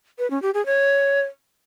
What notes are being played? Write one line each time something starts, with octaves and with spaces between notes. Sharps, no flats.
B4
C#4
G4
G#4
C#5